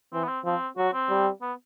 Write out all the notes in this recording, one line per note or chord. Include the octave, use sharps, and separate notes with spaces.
E3 C4
B3
C4
F3 C4
F#3 F#4
C4
G3
B3